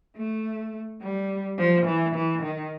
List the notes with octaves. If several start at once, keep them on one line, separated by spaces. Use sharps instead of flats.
A3
G3
F3
E3
E3
D#3